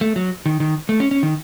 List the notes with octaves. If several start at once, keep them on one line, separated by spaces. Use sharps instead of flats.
A3
F#3
D#3
D#3
A3
C#4
C#4
D#3